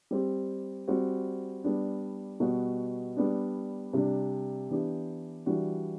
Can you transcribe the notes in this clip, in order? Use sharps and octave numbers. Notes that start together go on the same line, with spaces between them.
G3 C4 G4
G3 C4 F#4
G3 B3 D4
B2 G3 B3 F#4
G3 B3 D4
C3 G3 D4
E3 B3 D4 G4
E3 G3 D4 F#4